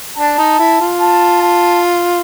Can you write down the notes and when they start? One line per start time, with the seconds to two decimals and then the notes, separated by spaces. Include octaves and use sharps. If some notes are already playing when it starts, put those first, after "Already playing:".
0.17 D4 A5
0.38 D#4
0.59 E4
0.80 F4
1.00 A5
1.42 A5